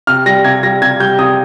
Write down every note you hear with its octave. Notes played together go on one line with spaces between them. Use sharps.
C3 F6
G3 A#6
C3 G#6
G3 A#6
C3 G#6
G3 G6
C3 D#6